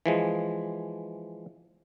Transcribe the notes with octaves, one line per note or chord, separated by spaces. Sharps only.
E3 F3 G#3